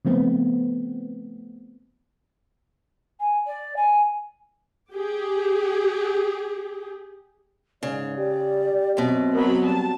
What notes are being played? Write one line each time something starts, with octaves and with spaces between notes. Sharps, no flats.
C#3 F3 A3 B3 C4
G#5
D5
G#5
G4 G#4
G#2 C#3 D5
G4 D5
F#2 B2 C4
F#3 B3 A#4 B5
G3 A5